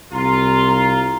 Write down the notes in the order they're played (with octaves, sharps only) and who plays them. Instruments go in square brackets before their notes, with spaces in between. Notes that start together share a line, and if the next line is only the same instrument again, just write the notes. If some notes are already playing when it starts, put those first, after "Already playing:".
[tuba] C2 [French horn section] F4 [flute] A#5 [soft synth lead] C6